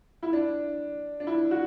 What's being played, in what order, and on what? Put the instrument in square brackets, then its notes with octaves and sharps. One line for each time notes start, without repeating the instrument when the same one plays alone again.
[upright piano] E4
D4
D4
E4
F#4